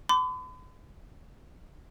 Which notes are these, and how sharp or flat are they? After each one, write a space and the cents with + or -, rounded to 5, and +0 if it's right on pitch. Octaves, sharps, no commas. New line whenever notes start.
B5 +45 D6 -5